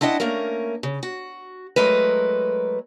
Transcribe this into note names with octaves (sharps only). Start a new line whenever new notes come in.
C4 D4 E4 D#5 F#5
A3 A#3 C#4 A#4
C#3
F#4
F#3 G#3 A3 A#4 B4